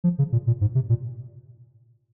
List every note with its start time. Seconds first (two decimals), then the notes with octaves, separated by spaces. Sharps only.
0.04 F3
0.19 C#3
0.32 A#2
0.47 A#2
0.61 G#2
0.75 C3
0.89 A#2